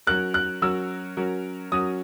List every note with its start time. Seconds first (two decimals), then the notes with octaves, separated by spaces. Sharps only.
0.07 F#3 C#4 F#4 A#4 F#6
0.34 F#6
0.62 F#3 C#4 F#4 A#4 E6
1.17 F#3 C#4 F#4 A#4
1.72 F#3 C#4 F#4 A#4 D#6